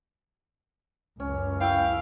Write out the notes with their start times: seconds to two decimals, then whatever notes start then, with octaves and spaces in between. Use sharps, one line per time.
1.20 C#2 F#2 C#4
1.61 E4 E5 F5 G5